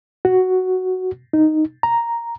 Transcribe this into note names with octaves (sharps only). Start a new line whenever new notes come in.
F#4
D#4
A#5